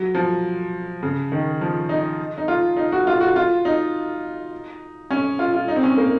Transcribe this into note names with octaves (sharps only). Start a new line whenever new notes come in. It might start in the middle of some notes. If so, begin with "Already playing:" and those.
Already playing: F#3
F3
C#3
D#3
F3
D#4
D#4
F4
D#4
F#4
F4
F#4
F4
D#4
C#4
F4
F4
D#4
C4
C#4
A#3